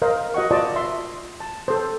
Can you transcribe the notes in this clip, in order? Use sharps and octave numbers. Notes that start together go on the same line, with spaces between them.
A#4 C5 D#5 F5
F#4 D#5 F#5 C#6
F4 C5 D5 D#5 A5
E5 C6
A5
A4 C5